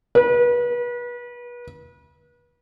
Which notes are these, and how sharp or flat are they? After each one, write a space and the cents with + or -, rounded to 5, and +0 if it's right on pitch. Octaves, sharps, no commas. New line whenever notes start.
B4 -35